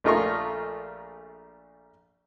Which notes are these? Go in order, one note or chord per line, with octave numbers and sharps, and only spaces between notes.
A#1 A3 F4 A#4 D#5 C#6